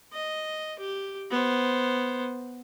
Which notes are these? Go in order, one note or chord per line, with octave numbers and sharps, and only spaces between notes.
D#5
G4
B3 C5